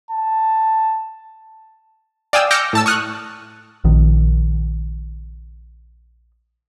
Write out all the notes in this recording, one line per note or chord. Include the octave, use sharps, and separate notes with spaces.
A5
D5 F5 G5 G#5 D#6 E6
D6 E6 F6 G6 A#6 C#7
A2 A5 E6
C#6 D#6 F6 F#6
A#1 D#3